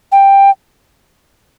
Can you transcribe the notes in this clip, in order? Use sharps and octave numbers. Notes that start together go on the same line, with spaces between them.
G5